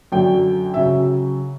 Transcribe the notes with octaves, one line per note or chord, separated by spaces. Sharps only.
F#2 D3 F#3 G5
C#3 F#3 E5